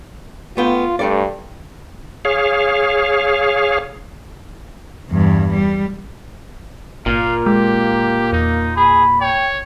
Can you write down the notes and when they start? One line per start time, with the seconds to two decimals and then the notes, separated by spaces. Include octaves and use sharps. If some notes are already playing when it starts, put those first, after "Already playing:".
0.57 A3 B3 F4 G5
0.99 G2 A3 A4 D5
2.25 G#4 C#5 F5
5.10 E2 G2
5.53 G3
7.06 G1 A#2 A#3 F5
7.46 G#3 G4
8.32 E2 D#4
8.76 G#4 B5
9.21 C#5 G5